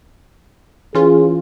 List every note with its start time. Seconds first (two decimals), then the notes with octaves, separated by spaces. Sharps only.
0.95 E3 C#4 F4 G#4